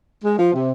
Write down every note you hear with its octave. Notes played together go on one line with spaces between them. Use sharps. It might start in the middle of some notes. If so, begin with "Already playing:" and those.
G#3
F3
C3